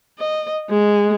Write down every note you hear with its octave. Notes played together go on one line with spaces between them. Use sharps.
D#5
G#3